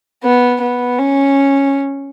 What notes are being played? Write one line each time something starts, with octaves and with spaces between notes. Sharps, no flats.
B3
B3
C#4